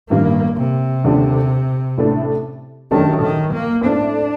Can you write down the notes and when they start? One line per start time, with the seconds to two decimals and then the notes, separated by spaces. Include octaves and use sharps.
0.10 A1 G2 D#3 G3 A#3
0.57 C3
1.04 D#2 D3 A3 D4 G4
1.98 A1 A2 A3 D4
2.91 F#2 D#3 F#3 A3 D4 G4
3.22 D#3
3.54 A#3
3.85 A2 A3 C4 D4